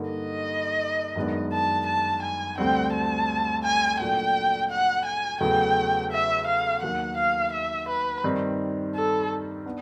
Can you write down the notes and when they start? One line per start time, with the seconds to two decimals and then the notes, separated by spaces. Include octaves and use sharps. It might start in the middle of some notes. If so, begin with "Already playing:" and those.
Already playing: G2 D3 G3 A#3 D#4
0.10 D#5
1.16 F#2 D#3 G#3 B3 D4
1.52 A5
1.86 A5
2.22 G#5
2.58 D2 D3 G3 C4 G5
2.93 A5
3.63 G#5
4.00 A#2 F#3 A3 D4 G5
4.70 F#5
5.05 G#5
5.41 E2 C#3 F#3 A3 G5
6.12 E5
6.47 F5
6.82 D#2 D#3 F#3 A#3 F#5
7.17 F5
7.52 E5
7.89 B4
8.24 G2 D#3 G3 C4 D#4
8.95 A4
9.66 B3 D4